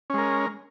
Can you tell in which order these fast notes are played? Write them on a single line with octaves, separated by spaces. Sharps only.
C#4 G#3 A#4